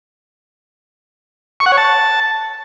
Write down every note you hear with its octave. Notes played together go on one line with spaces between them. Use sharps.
C#6
F#5
C#5
A5